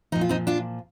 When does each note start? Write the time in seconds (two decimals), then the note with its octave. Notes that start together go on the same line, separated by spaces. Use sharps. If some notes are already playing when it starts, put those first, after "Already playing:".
0.12 A#2 F3 D#4
0.21 F4
0.29 C4 D#4
0.47 D4 F4